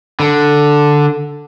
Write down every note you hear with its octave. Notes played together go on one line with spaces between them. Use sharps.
D3